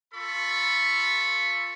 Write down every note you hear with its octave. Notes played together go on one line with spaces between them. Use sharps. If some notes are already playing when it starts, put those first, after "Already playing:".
F4 A4 B5 C#6